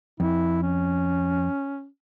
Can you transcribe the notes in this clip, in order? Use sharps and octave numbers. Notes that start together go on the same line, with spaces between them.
F2 E4
C#4